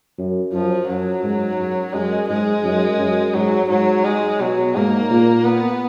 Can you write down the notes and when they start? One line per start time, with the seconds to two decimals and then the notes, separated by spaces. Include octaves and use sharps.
0.18 F#2
0.53 F#2 F3
0.88 F#2 F#3
1.23 G#2
1.59 F#2
1.93 F#2 G#3
2.29 G#2 G#3
2.64 F#2
2.99 F#2
3.34 G#2 F#3
3.69 G#2 F#3
4.05 G#3
4.40 B2 F#3
4.75 G#2 A#3
5.11 A#2
5.45 B3